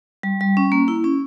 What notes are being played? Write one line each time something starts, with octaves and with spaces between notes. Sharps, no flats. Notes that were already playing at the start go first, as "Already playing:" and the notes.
G3
G3
C#4
A#3
E4
C#4